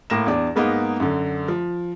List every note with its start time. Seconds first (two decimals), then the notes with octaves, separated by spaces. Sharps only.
0.10 A2 A#3 A#6 E7
0.27 E2 D4
0.56 G#2 G#3 A#3 B3 D#4
1.00 F#2 D3
1.48 F3